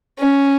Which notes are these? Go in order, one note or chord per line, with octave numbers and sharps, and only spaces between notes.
C#4